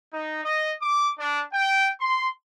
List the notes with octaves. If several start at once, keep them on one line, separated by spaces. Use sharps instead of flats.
D#4
D#5
D6
D4
G5
C6